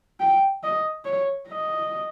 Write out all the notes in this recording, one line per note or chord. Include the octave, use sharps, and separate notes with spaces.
G5
D#5
C#5
D#5